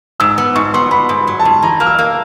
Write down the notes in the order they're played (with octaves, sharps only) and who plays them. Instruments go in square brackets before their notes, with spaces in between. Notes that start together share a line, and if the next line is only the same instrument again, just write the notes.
[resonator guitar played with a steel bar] G#2 [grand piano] E6
[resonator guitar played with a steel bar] B3
[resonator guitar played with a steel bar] G#2 [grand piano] C#6
[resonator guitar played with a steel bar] B3 [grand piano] C6
[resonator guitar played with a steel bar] B3 [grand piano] B5
[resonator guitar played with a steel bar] G#2
F#3
[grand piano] A5
[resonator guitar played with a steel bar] G#2
[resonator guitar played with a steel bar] E3 [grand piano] A#5
[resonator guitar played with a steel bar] A#3 [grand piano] F6
[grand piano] E6
[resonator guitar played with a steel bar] A#3